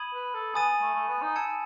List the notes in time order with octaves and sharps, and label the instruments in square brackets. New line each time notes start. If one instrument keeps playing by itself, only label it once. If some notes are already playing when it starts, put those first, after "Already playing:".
Already playing: [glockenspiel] B5 D#6 G#6 D#7 F#7
[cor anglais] B4
A4
[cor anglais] B3 [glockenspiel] G#5 D#6 A6 D#7
[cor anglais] A3
A3
B3
D#4
[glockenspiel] A5 E6 G#6 C#7